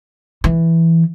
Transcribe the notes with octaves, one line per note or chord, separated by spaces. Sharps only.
E3